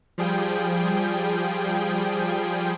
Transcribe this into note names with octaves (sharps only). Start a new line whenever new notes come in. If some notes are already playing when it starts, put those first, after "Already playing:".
F3 G3 G#4 G5